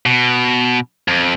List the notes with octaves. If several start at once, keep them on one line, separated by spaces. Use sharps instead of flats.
B2
F2